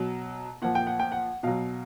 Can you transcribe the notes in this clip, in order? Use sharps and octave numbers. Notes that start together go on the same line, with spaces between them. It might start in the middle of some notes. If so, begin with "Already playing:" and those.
Already playing: B2 F#3
A#2 F3 F#5
G5
F#5
G5
F#5
B2 F#3 F5